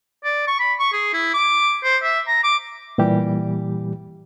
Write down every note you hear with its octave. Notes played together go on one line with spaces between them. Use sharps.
D5
C#6
B5
C#6
G#4
E4
D6
C5
E5
A#5
D6
A#2 E3 G3 G4